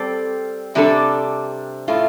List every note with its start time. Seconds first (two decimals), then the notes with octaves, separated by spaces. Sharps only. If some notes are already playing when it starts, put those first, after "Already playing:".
Already playing: G3 C4 A4 D5
0.75 C3 G3 D4 A4
1.88 A2 A3 F4